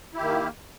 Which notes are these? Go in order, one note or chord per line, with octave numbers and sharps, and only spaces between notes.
D#3 A#3 E4 G4